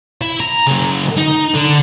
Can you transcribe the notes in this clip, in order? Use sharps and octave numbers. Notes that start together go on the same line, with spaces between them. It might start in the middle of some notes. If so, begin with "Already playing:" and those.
E4
A#5
C#3 F#3
D#4
D3